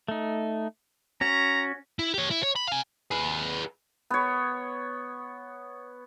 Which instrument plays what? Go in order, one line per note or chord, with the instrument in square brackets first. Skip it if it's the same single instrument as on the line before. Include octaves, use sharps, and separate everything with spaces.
[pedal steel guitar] A3 D#4
[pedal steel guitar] C#4 F#4 [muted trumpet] A#5
[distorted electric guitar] E4
G4 C#5
E4
C#5
B5
F5 G#5
[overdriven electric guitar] G#4 B4
[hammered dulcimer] B3 C#5